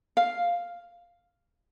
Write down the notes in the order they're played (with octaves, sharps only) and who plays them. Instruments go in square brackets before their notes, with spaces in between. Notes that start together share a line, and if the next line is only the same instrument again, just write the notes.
[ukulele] F5